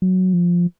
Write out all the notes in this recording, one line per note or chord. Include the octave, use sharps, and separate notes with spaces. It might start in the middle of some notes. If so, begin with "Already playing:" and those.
F#3
F3